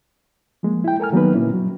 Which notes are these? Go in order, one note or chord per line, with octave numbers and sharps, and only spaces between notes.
F3 G#3 A#3
E4 G5
A4 A#4 G#5 F6
D#3 F#3 A#3 B3 D#4 B4
A#2 D3 A#3 C#4 E4
F#3